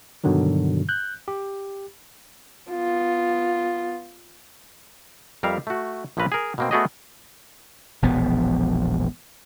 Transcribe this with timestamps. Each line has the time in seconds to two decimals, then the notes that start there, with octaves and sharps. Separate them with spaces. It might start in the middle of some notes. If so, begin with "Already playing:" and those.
0.24 G2 B2 D3 D#3 F#3
0.89 F#6 G6
1.28 G4
2.70 B3 F4
5.43 F2 G3 A#4 E5 F5
5.67 A3 F#4
6.17 A#1 F3 C#4 A4 B4 A#5
6.32 G#4 A#4
6.58 B2 A#3 C4
6.71 A3 B3 F#4 G#4 D5 D#5
8.02 E1 A#1 F3 B3